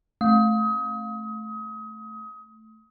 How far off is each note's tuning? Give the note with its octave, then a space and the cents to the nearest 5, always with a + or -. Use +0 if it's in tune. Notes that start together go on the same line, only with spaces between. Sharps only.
A3 -5 D#6 +30